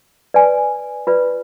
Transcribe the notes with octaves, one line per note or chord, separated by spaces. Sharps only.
B4 D5 G#5
F4 B4 D5